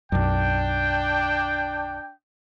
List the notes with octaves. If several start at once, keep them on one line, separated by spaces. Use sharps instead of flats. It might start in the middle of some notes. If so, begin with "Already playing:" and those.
B1 F#2 D4 G5